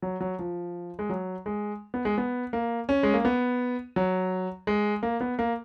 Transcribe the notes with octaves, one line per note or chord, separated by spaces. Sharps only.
F#3
F#3
F3
G#3
F#3
G#3
B3
G#3
B3
A#3
C#4
G#3
A#3
B3
F#3
G#3
A#3
B3
A#3